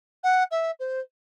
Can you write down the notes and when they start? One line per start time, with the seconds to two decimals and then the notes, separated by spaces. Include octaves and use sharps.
0.23 F#5
0.51 E5
0.79 C5